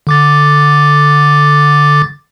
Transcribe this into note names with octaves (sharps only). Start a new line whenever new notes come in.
D3 D6 A6